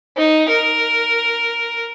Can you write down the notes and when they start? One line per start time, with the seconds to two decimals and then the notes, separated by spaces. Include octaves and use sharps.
0.17 D#4
0.49 A#4